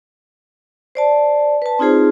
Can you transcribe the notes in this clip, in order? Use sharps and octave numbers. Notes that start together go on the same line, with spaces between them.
C5 D5 A5
B4 A5
C4 D#4 F4 G#4 C5